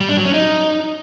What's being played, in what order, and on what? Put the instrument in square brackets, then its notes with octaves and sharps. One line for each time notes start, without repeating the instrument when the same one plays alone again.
[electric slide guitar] G3
D4
F#3
C#4
D#4